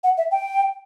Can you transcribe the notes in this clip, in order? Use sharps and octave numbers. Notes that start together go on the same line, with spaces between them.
F#5
E5
G5